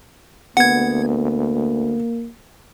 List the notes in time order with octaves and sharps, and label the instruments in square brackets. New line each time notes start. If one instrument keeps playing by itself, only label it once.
[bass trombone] D2 [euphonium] A#3 [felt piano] B3 [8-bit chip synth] F#5 G#6